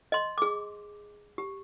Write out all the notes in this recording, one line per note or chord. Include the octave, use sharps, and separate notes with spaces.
D#5 C6
G#4 D6
G4